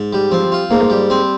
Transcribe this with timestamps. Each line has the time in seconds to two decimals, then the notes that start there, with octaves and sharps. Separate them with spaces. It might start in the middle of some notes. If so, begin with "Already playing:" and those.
Already playing: G#2
0.13 G3
0.31 F3 C4
0.52 F4
0.70 G#2 A#3
0.90 G3
1.10 C4